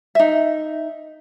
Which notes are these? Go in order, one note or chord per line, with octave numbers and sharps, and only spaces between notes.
D#4 E5